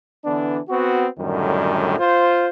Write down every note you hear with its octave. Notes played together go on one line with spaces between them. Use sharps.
D3 E3 B3 D4
B3 C4 F#4
F#2 A2 D3 D#3 G3
F4 C5